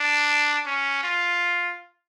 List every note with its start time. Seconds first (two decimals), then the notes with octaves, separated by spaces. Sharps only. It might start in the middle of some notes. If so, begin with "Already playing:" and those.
Already playing: D4
0.66 C#4
1.03 F4